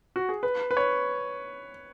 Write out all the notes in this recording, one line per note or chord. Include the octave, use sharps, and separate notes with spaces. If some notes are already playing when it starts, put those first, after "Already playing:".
F#4
G#4
B4
B4
C#5